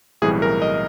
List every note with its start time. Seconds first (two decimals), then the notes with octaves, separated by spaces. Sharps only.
0.22 B1 A2 E3 G3 C4 G#4
0.42 A#4
0.62 D#5